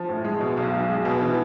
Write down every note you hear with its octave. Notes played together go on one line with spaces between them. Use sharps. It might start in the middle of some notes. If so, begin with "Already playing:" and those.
Already playing: F3
A2
G#3
B2
B1
B1
G#3
B2
E3